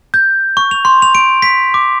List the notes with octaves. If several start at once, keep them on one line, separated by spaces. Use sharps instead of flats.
G6
C#6
F7
C6
F7
D7
B6
D6